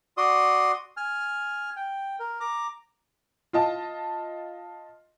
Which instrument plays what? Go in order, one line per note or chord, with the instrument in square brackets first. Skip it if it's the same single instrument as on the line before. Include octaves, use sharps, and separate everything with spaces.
[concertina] F#4 D5 C6 D#6
G#5 F6
G5
A#4
A#5 D6
[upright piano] F4 D#5 A5